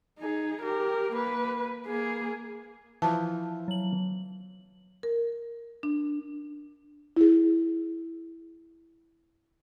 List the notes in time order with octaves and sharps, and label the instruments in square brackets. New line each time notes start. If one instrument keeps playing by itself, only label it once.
[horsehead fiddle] D#4 G#4
G4 A#4
A#3 B4
A#3 G#4
[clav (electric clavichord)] E3 F3 [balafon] A5
[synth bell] F#3 F#7
[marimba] A#4
D4
E4 G#4